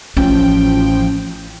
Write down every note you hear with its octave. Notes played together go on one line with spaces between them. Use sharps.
A1 F3 C#4 G5